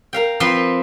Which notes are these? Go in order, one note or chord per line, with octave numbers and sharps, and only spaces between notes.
A#4 F5 G5
F3 C4 B4 C6